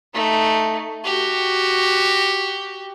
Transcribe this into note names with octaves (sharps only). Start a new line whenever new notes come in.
A3 D#4
F#4 G4